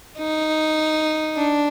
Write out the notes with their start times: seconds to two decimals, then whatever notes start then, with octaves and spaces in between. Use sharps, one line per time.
0.18 D#4
1.36 D4